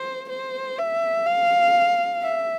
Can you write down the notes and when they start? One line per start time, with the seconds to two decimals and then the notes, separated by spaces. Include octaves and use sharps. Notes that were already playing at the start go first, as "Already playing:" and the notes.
Already playing: C5
0.30 C5
0.78 E5
1.27 F5
2.22 E5